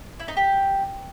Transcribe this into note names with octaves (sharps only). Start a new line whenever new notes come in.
E4
D#4
G4